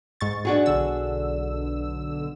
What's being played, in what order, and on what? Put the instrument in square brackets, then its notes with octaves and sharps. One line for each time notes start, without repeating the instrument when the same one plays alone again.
[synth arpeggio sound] G#2 C#6 A6
[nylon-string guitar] D4 F#4 G#4
[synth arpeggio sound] B1 D3 E6